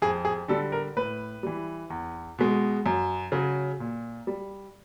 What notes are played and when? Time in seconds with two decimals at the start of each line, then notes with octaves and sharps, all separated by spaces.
0.02 F2 G#4
0.25 G#4
0.48 D3 G3 A4
0.72 A#4
0.96 A2 B4
1.43 E3 G3
1.90 E2
2.38 B2 G#3
2.86 F#2
3.32 C#3 F#3
3.80 A#2
4.27 G3